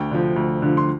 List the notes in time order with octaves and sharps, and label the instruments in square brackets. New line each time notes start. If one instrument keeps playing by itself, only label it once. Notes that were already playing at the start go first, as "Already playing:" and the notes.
Already playing: [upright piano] D2 G5
D3 F3
D2
D3 F3
C6